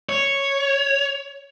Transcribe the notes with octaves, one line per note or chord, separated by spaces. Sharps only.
C#5